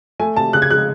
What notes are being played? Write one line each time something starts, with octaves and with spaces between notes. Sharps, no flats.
A3 G#5
C3 A5
C#3 F#6
G#6
G#3 F#6